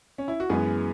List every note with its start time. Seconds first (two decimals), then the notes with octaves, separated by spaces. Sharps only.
0.18 C#4
0.28 E4
0.40 F#4
0.49 F#2 E3 G#3 B3 G#4